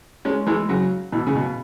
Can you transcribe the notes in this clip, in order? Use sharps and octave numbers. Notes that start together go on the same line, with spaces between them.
G#3 C#4
E3 G#3
C#3 F#3
B2 E3
C#3
B2